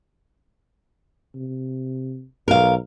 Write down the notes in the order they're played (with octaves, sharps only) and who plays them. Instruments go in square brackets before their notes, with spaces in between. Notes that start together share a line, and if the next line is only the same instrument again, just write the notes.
[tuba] C3
[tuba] B1 [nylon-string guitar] A#4 F5